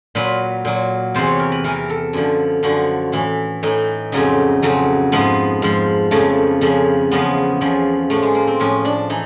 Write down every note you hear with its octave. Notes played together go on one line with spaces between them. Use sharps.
A#2 F#3 B4
A#2 F#3
E2 C3 E3 C5
C#5
A#4
B4
E2 C3 E3 A#4
A4
F#2 D3 F3
F#2 D3 F3 F#4
A2 E3
A2 E3 D#4
F2 C#3 F#3 D#4
F2 C#3 F#3
G#2 F3 B3
G#2 F3
F2 C#3 F3 A3
F2 C#3 F3
E2 C#3 F3 B3
E2 C#3 F3
A2 F3 A3
G#3
A#3
C4
A2 F3 C#4
D4
E3 D#4